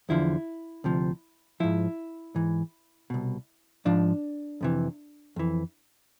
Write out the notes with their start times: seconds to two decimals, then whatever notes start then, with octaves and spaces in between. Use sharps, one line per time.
0.09 E2 D3 F3 E4
0.84 D2 C3 F3
1.60 G#2 F3 E4
2.35 G#2 E3
3.10 C2 B2
3.85 G#2 F3 D4
4.61 F2 C3 E3
5.36 F2 E3